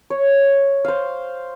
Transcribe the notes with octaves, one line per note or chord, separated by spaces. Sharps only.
C#5
C5 F5